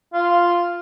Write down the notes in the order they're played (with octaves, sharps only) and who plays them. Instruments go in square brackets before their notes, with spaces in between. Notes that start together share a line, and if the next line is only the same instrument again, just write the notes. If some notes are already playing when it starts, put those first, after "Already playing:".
[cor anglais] F4